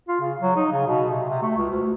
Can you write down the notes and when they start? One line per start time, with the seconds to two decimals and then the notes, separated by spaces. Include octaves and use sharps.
0.08 F4
0.20 C#3
0.41 F#3
0.56 D#4
0.71 C#3
0.87 B2
1.10 C3
1.29 C3
1.42 A3
1.58 C#2
1.70 D2